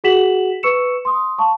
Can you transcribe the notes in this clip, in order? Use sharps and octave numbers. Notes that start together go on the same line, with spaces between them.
F#4 G#4 F#5 B6 E7 F#7
B4 C#6 E6 C#7 E7
C6 D#6
F5 A5 C#6